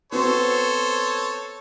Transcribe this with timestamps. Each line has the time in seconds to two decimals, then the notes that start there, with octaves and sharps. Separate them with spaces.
0.12 B3 C4 F#4 A4 C5 C#5